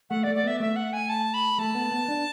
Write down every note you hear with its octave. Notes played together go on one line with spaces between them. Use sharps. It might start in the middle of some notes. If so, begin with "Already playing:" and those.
A3 F#5
D5
A3
D5
B3 E5
A3 E5
F#5
G#5
A5
B5
A3 A5
B3
B3
D4